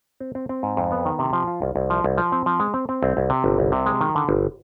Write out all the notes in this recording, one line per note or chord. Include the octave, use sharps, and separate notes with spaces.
C4
C4
C4
G#2
F2
B3
D#3
C3
F3
F4
C2
C2
F3
C2
F3
C4
F3
G#3
C4
C4
C2
C2
C3
G1
C2
C3
G#3
D#3
D3
G1